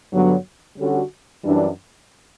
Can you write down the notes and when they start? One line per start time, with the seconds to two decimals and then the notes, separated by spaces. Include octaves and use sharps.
0.11 G2 D3 F#3 B3
0.77 D3 G3 C#4 F#4 A4
1.44 F#2 E3 G3 D4